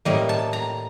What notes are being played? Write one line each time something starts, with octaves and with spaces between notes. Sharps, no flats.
A2 G3 A#3 D#5
A5
A#5